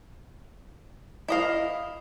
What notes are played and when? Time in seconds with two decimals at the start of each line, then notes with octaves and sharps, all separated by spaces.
1.28 E4 D#5 F5